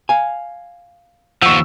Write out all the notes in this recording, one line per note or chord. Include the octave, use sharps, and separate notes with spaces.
F5 G#5
D#2 F3 F#5 C#6 E6